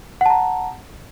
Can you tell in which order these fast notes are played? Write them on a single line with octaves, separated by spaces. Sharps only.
F#5 A5 A#5